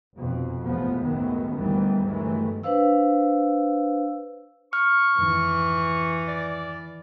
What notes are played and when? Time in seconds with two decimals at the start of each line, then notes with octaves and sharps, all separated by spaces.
0.16 F1 F2 B2
0.65 A1 E2 F3 G#3 B3
1.03 C#2 F#2 A2 D#3 F#3 B3
1.56 D2 A#2 D#3 E3 G3 B3
2.05 G1 D#3 E3 F#3 G#3 A3
2.63 D4 B4 C5 F5 E6
4.73 C#6 F6
5.18 F2 G#2 D#3 E3
6.28 D5